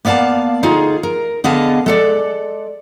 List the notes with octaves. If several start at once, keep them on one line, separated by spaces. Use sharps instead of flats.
A#3 B3 D5 F5 A5
D2 D#4 F4 G#4
A#4
D3 B3 G#4 D#5 F5 A5
G#3 A4 D5